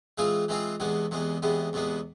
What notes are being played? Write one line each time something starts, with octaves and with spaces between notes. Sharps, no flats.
E3 G#3 C4 F4 G#4
E3 G#3 C4 F4 G#4
E2 C3 G#3 B3
E2 C3 G#3 B3
E2 C3 G#3 B3
E2 C3 G#3 B3